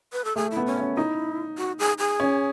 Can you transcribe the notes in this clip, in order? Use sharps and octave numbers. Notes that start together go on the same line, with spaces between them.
B4
A4
A3 G#4
E4
B3
C#4
C#4
D#4 E4
F#4
G#4
G#4
C#4